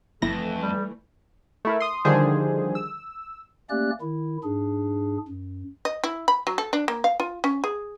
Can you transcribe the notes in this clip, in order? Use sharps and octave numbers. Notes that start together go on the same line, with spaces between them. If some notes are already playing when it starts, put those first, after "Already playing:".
G1 F2 E3 A3 E4 A#6
G3
A3 E4 A#4
C6 D#6
D3 D#3 F3 G3 G#4 C5
E6
A3 A#3 C#4 G4 D5 F#6
D#3 E4
G#2 D4 G#4
F#2
D#5
E4
B5
F#3
A4
D4
A#3
F5
F4
C#4
G#4